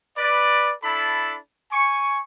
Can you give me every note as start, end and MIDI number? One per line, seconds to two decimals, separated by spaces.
0.17 0.74 71
0.17 0.74 74
0.84 1.37 62
0.84 1.37 64
0.84 1.37 69
0.84 1.37 81
0.84 1.37 83
1.72 2.21 80
1.72 2.21 85